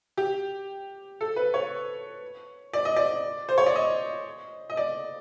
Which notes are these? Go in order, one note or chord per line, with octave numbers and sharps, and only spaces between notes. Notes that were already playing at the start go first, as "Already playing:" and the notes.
G4
A4
B4
C#5
D5
D#5
D5
C5
C#5
D5
D#5
D#5
D5